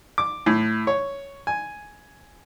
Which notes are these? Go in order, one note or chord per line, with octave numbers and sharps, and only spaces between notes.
D6
A2
C#5
G#5